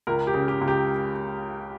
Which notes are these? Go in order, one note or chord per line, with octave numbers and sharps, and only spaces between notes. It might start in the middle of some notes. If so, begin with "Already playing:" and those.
C#2 A#4
G4
C#3
G4
C#2
G4